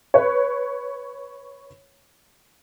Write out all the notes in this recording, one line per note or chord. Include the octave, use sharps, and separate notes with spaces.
B4 C#5